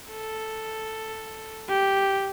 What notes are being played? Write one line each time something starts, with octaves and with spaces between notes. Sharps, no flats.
A4
G4